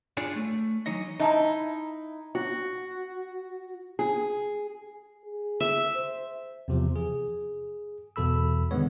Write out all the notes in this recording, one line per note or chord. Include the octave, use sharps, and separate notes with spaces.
D4 F4 G#4 C#5 D5
A3
E3 F#3 D#4 C#5 D#5
D#4 E4 E5 A5 A#5
F#4
G#4
G#4
E5
C5
E2 C3 F3
G#4
E2 B2 A4 B5 E6
D3 D#3 G#3 B3 C#5